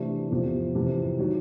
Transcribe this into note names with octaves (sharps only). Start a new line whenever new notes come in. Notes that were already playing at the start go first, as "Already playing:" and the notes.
Already playing: C3 E3 A3 D4 G4
E2 C3 F3
F2 C3 E3
D#3 F#3